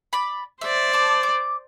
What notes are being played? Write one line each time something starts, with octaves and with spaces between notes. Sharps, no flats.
D5 B5
C5 D5 E5
A5 D6
D6